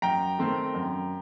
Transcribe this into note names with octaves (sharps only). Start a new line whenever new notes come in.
F#2 G5 A#5
D#3 A3 C4
F#2